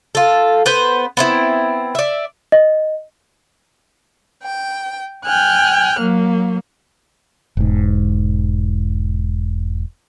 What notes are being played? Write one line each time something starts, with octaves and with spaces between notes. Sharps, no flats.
F4 A4
B3 B4 C5
B3 C4 E4
D5 E5
D#5
G5
G5 G#5 F6 F#6
F#3 A#3
E1 G#2